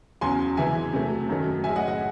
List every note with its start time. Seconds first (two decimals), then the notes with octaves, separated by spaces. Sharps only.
0.21 E2 C#3 F#3 G#5 C6
0.57 C3 E3 G#3 E5 G#5
0.93 C3 F#3 A3
1.29 F#2 D#3 F#3 A3
1.64 A2 G#3 E5 G#5
1.76 D#5 F#5
1.88 D#5 F#5